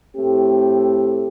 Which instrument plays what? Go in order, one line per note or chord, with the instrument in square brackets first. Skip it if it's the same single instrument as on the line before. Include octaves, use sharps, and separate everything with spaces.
[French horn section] A2 A3 C4 G4